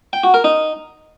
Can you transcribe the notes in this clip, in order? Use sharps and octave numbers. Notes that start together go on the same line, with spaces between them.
G5
F#4
A#4
D#4